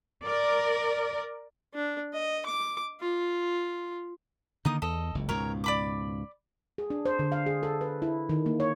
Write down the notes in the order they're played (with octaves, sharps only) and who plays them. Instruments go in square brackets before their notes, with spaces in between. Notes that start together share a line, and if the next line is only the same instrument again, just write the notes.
[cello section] A#4 D5
[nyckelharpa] D4
D#5
D6
F4
[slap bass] D3 D#3 A#3 [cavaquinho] D#4 D#6
[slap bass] E2 [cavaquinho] A4 D#5
[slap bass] F#1 C#2
[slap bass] C#2 G#2 B2 [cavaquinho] A#4 C#5
[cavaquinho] D5 B5 D6
[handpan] G#4
D4
C5
D3
F5
G#4
A4
B4
E4
D#3
A#3
C#5